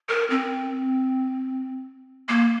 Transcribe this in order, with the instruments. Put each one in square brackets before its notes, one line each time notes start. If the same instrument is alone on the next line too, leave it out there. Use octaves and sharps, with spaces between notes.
[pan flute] A#4
C4
A#3